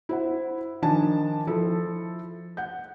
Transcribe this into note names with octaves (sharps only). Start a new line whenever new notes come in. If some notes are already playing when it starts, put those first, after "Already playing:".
E4 C5 F#5
D#3 F3 D4 G#5 A5
F3 E4 A4
F#5 G6